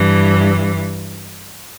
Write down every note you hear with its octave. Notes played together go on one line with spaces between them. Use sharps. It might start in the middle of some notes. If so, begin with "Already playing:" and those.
Already playing: G2 E3